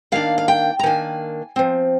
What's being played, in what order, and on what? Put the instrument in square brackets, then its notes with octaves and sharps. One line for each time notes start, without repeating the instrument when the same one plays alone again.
[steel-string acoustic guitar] D#3 A#3 D4 F5
F5
G5
A#5
D#3 A#3 D4 G#5
F3 C4